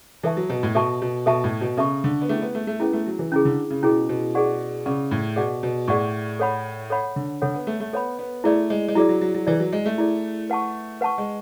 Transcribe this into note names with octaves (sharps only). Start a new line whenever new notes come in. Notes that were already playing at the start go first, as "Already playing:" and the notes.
E3 A4 E5 A5 C#6
F#3
B2
A2
B2 A4 E5 A5 C#6
B2
B2 A4 E5 A5 C#6
A2
B2
C#3 A4 E5 A5 C#6
D3
B3
A3 C#4 E4 G#4
B3
A3
A3
B3 C#4 E4 G#4
A3
F#3
E3
C#3 C#4 E4 G#4
D3
C#3
B2 C#4 E4 G#4
B2
G#4 D5 F#5 C#6
C#3 G#4 D5 F#5 C#6
A2
B2 G#4 D5 F#5 C#6
B2
A2 G#4 D5 F#5 C#6
A4 C#5 F#5 B5
A4 C#5 F#5 B5
D3
D3 A4 C#5 F#5 B5
B3
A3
A3
B3 A4 C#5 F#5 B5
B3
A3 E4 G#4 D5
G#3
G#3
F#3 E4 G#4 D5
F#3
F#3
F#3
E3 E4 G#4 D5
F#3
G#3
A3
E4 G#4 D5
B4 F#5 A5 C#6
B4 F#5 A5 C#6
G#3